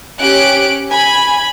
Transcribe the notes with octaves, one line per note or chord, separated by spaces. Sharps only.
C#4 G4 F#6 D7
G#5 B5